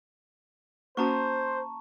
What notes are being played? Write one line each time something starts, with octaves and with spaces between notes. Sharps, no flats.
A#3 C#4 F#4 C5 A5 A#5 C#6